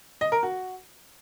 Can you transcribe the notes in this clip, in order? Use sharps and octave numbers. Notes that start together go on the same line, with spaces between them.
D#5
A#4
F#4